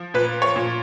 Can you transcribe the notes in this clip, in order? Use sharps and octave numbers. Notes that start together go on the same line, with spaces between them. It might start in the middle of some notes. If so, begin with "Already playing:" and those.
Already playing: F3
A#2 B4
C#5
A#2